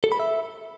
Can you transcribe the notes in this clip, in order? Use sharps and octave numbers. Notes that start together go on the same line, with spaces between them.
A4
B5
E5